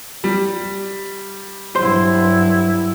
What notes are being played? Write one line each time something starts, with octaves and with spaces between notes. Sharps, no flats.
G3
G2 F#3 E4 C5